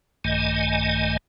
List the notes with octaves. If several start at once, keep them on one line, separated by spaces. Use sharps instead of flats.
A#1 G2 D#3 A3 D#5 G#5